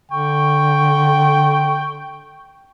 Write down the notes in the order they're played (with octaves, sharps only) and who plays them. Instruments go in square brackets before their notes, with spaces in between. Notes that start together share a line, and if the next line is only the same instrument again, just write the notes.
[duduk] D3 [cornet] G5 [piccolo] C#6